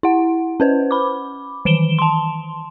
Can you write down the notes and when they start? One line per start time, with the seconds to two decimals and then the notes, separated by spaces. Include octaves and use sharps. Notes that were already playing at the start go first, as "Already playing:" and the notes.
0.03 E4 F#5
0.60 C#4 B4 C5
0.91 B5 D6
1.65 D#3 E3 D7 E7 G7
1.99 A5 C6